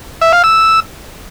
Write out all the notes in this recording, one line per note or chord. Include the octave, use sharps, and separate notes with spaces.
E5
F5
E6